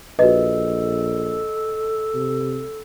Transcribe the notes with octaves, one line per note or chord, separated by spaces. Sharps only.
A#1 F#4 A4 B4 D#5
C3